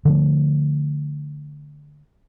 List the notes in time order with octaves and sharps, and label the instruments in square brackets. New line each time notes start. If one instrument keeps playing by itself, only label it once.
[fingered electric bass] D3 F3 A3